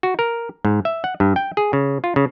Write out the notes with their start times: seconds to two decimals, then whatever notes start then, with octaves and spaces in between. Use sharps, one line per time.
0.03 F#4
0.19 A#4
0.65 G#2
0.85 E5
1.04 F#5
1.20 G2
1.36 G5
1.57 G#4
1.73 C#3
2.04 F4
2.16 C#3